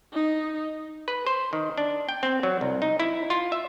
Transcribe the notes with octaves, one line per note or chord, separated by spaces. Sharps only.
D#4
B4
C5
D#3
D4
G5
C4
F#3
C2
D#4
E4
F4
E5